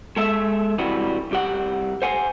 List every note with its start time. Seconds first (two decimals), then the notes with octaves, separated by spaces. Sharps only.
0.17 G#3 A4 E5
0.78 C3 E3 G3 F#4 B4
1.31 C2 G4 F#5
2.02 C5 F#5 G#5